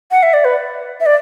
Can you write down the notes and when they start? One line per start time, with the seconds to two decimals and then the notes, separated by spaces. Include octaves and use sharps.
0.11 F#5
0.23 E5
0.34 D5
0.45 B4
1.00 E5
1.06 D5